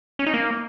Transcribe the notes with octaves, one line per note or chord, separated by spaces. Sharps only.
C#4
D#4
A#3